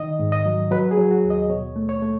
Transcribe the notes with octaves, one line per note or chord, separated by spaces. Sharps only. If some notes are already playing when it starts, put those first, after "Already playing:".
Already playing: D#3 D#5
G#2
D#5
F#3
F#3 B4
G#4
F#3
F#4
D#2
D#5
B2 C#5
A3
C#5
A3